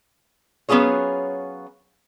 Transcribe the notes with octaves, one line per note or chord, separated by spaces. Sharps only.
F#3 B3 C#4 F4 G#4 C#5